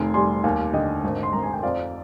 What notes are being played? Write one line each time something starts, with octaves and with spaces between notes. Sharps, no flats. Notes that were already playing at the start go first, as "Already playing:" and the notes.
Already playing: F1 D#3 G#5 C6
G3 G#5 C6
D#2 F5 G#5
D3 D#5 G5
G#1
C6
G#1 A#5
G#5
G5
F2 D5 F5